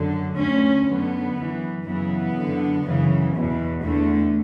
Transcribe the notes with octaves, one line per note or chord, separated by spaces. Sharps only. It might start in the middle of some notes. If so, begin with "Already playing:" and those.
Already playing: F#2 D3
D2 D3 C#4
F#2 D3 B3
F#2 E3
F#2 C#3 E3 B3
F#2 D3
F#2 C#3 E3
E2 B2
E2 D3 A3